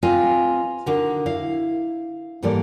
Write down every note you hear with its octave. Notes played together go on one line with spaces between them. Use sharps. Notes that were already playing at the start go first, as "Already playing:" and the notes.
C4 F4 G#4 B4 D#5 G#5
D3 D#4 F#4 A#4
E4 F5
G#2 E3 G3 A#3 A4 D5